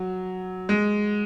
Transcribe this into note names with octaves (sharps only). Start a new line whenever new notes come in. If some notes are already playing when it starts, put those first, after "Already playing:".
Already playing: F#3
G#3